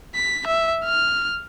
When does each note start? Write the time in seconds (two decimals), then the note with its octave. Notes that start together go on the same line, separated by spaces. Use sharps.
0.15 B6
0.47 E5
0.85 F6